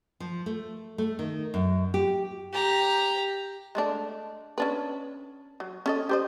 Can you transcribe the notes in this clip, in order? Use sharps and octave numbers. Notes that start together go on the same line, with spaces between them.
F3
A3
A3
D#3
F#2
G4
G4 A#5
G#3 A3 D4
C#4 D4 B4
F#3
C#4 A4 D#5
G4 C5 D#5